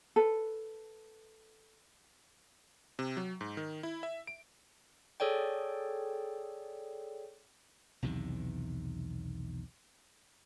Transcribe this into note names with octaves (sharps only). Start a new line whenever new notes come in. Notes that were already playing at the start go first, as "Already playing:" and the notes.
A4 B4
C3
F#3
G#2
D#3
E4
E5
D7
G#4 A4 C#5 D5 G5
B1 E2 C3 D#3